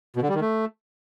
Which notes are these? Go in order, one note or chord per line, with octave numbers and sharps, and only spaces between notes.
B2
D3
G3
D#3
A3